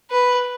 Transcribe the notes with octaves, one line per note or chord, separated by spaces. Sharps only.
B4